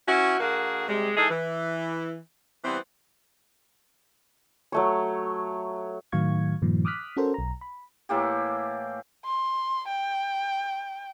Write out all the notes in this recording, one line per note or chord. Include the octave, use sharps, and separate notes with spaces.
C#4 E4 F#4
D3 A#3 F#4 G#4 A#4
C3 G3 G#3
E3 G#3 D#4 G#4 A4
E3
E3 G3 B3 C4
F#3 A3 C#5
A2 D#3 F#3 F5 C#6 G#6
G2 A#2 D#3 F3
D6 D#6 F6 F#6 B6
C#4 F#4 A4 A#4 C5
B1 A#5
B5
A2 E3 A#3 G4
C6
G5